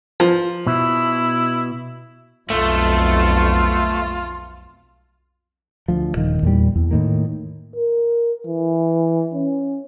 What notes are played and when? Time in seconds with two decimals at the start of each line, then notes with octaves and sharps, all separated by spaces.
0.20 F3
0.67 B2 E4
2.50 B1 F2 A3 F4
5.88 D2 F3
6.14 D#1 D#3
6.43 E2 A#2 G3
6.76 E2
6.91 A2 D#3 A#3
7.76 A#4
8.47 E3
9.34 C#4